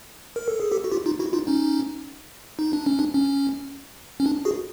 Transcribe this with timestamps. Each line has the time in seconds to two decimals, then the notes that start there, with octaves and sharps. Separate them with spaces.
0.36 A#4
0.48 A4
0.60 G#4
0.72 G4 A4
0.84 F#4
0.92 F4 G4
1.06 D#4 F4
1.19 E4 F#4
1.33 D#4 F4
1.47 C#4 D#4
2.59 D#4
2.73 D4
2.86 C#4
2.99 D4
3.14 C#4
4.20 C#4
4.26 D4
4.45 F#4 G#4